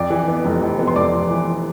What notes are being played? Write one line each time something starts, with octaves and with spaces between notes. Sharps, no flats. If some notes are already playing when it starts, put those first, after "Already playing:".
Already playing: F2 D5 D6
E3
B3
F1
F1
B3
C6
F1 D5 D6
F1
E3